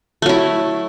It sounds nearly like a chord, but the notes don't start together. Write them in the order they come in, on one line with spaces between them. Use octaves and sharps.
A3 F#3 E4